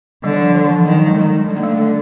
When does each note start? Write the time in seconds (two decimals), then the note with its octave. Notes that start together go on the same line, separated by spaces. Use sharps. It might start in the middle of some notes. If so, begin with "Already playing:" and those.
0.24 D3 G3
0.33 E3
0.39 F3
0.55 E3
0.70 F3
0.85 D#3 F#3
1.06 G#3
1.16 D#3 G3
1.48 D3 G3
1.56 A#3
1.63 A3
1.79 G3